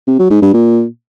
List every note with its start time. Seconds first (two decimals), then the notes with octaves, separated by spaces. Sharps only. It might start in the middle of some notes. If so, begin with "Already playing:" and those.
0.07 C3
0.19 F#3
0.30 G#2
0.42 G2
0.53 A#2